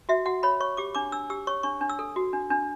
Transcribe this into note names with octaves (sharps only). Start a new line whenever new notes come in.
F#4 E5
F#4 F#5
C#5 B5
C#5 C#6
G4 D6
D4 D6
D4 E6
G4 E6
C#5 C#6
D4 C#6
D4
E6
A4
F#4
D4
D4